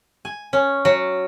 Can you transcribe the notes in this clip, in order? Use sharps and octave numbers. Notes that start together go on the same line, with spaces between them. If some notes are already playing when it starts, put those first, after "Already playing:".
G#5
C#4
F#3